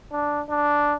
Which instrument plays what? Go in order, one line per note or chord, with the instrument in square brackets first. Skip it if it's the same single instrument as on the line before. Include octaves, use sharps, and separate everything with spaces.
[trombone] D4
D4